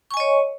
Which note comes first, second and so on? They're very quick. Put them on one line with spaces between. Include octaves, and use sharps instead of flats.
C#6 G#5 D#5 C#5